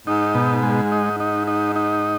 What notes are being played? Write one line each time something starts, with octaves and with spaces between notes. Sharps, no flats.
G#2 D#4
B2
G#3
D#4
D#4
D#4
D#4